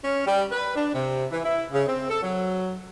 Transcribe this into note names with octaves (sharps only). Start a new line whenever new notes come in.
C#4
G3
B4
D4
C3
E3
E4
C#3
C4
A4
F#3